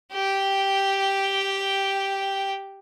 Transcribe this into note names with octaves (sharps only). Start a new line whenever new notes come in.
G4 G5